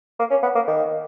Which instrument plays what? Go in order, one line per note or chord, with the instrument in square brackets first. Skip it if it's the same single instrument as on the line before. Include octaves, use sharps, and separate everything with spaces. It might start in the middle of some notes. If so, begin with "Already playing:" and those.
[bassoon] A#3
C#4
B3
A#3
D#3